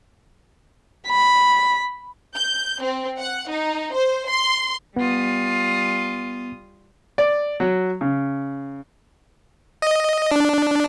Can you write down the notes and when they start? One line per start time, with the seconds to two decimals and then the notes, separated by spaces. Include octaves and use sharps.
1.07 B5
2.35 G6
2.81 C4
3.18 F#5
3.49 D#4
3.93 C5
4.28 C6
4.96 G3 B3 F4 D#6
7.18 D5
7.60 F#3
8.01 C#3
9.82 D#5
10.31 D4